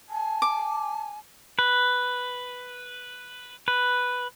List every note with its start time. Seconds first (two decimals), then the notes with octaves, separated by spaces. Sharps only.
0.09 G#5 A5
0.42 D6
1.59 B4
3.68 B4